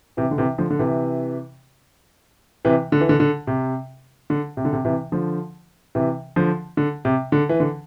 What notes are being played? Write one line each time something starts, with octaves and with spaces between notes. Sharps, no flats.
C3 E3
D3
C3 E3
D3 F3
D3
C3 E3
C3 E3
D3
E3
D3
D3
C3
D3
C3
D3
C3
C3 E3
D3 F3
C3 E3
D3 F3
D3
C3
D3
E3
D3